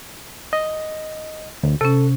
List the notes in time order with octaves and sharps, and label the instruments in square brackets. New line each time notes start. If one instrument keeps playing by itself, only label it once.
[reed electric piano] D#5
D2
[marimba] C3 C#4 [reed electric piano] A4